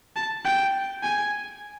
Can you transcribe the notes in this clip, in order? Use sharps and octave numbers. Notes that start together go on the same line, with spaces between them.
A5
G5
G#5